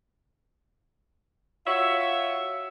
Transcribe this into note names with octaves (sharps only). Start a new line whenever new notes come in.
F4 F#4 C#5 E5